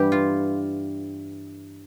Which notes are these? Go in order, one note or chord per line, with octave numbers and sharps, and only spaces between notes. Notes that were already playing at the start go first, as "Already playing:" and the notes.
Already playing: G2 E3 G3 G4
F4